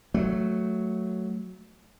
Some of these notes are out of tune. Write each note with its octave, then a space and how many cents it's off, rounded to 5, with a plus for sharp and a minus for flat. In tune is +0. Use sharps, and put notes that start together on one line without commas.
F#3 +0 A3 +0